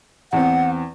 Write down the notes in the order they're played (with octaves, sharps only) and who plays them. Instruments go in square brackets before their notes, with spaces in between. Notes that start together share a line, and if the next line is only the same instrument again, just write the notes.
[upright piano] E2 C4 [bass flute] F#5